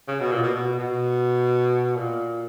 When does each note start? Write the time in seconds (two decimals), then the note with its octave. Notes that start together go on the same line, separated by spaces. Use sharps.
0.08 C#3
0.20 B2
0.32 A#2
0.43 B2
0.55 B2
0.78 B2
1.95 A#2